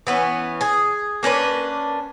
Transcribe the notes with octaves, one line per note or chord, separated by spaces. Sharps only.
E3 B3 C#4
G#4
A#3 C#4 D4 B4